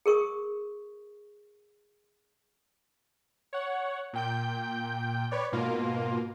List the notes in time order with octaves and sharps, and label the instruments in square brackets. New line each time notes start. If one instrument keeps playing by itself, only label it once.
[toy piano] G#4 A#4 C#6 D#6
[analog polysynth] C#5 F#5
A#2 G5 G6
B4 C#5 D5
G#2 B2 A#3 F4